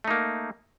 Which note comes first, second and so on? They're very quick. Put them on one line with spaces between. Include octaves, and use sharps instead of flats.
A3 D#4 A#3